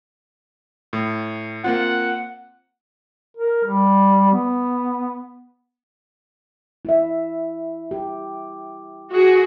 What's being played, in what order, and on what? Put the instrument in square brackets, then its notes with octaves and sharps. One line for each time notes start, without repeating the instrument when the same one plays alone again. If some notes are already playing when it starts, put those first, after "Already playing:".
[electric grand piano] A2
[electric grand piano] A#3 C4 F4 [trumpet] F#5
[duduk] A#4
G3
B3
[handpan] E4 E5
G4
[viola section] F#4 G#4